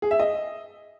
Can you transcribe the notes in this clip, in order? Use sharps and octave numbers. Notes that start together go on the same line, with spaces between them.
G#4
E5
D#5